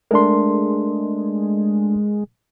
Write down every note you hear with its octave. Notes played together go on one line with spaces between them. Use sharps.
G#3 A3 D4 A#4 C6